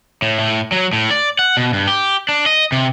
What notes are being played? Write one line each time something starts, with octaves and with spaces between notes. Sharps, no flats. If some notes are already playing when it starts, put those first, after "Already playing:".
A2
A2
F#3
A2
D5
F#5
B2
G2
G4
D4
D#5
C3